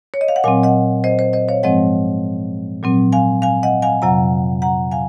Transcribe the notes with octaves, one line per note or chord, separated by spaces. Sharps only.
C#5
D#5
F5
F#5
A#2 F#3 C4 F5 G#5
D#5 F#5
C5 D#5
C5
C5 D#5
C#5 F5
G#2 F3 G#3 C4 D#5 F#5
A#2 F#3 C4
F5 G#5
F5 G#5
D#5 F#5
F5 G#5
F2 C3 F#3 F#5 A#5
F#5 A#5
F5 G#5